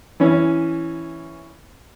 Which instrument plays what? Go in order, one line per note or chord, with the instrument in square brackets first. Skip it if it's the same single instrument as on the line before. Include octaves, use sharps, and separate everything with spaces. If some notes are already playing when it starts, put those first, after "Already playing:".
[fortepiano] E3 C#4